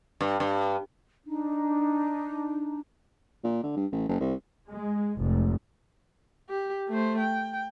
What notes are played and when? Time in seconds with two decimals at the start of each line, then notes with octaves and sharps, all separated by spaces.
0.21 G2
0.40 G2
1.26 D4 D#4
3.44 A#2
3.63 D3
3.77 G2
3.92 A1
4.09 F#1
4.20 C2
4.70 G#3
5.17 F1 G#2
6.49 G4
6.89 A3 C5
7.19 G5